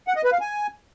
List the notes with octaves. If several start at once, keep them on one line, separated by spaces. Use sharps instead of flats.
F#5
D#5
B4
F5
G#5